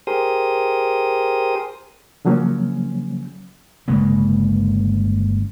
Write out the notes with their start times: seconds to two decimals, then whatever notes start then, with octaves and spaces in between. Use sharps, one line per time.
0.07 G4 G#4 A#4 C5 D#6
2.25 C#3 F3 F#3 A#3 C#4
3.88 G1 C#3 G#3 A#3